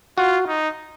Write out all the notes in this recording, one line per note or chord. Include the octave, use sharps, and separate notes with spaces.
F4 F#4
D#4